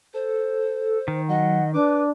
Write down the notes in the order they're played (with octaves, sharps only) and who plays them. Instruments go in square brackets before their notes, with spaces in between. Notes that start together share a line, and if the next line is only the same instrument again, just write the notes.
[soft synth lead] A4 [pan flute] C5
[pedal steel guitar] D#3
[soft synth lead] F#3 [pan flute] D#5 [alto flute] F#5
[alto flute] D4 [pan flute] B4 [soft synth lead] D6